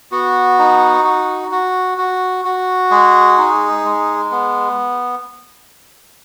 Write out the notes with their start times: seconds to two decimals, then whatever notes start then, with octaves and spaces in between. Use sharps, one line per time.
0.12 B3 F#4
0.59 D#4
1.04 F#4
1.51 F#4
1.98 F#4
2.45 F#4
2.91 G#3 G#4
3.38 D#4
3.85 G#3
4.31 B3